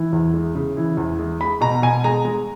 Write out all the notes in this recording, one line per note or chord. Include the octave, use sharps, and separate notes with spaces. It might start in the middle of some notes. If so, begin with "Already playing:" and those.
Already playing: E3
E2
G#3
C#3
E3
E2
G#3
G#3 B5
B2 A#5
B2 G#5
G#3 A#5
G#3